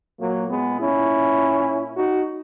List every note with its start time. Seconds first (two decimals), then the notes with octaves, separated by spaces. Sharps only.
0.20 A#2 F#3 A#3
0.50 G#3 B3
0.80 C#4 E4
1.97 D#4 F#4